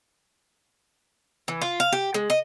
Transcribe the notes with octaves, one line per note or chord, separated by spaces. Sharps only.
E3
F4
F5
G4
G#3
D#5